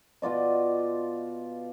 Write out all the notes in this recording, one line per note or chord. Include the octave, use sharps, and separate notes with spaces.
B2 F4 D5 D#5